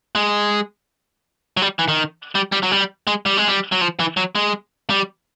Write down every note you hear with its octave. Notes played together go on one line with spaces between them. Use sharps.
G#3
F#3
G3
E3
D#3
G3
G3
F#3
G3
G#3
G3
G#3
G3
F#3
F3
E3
F#3
G#3
G3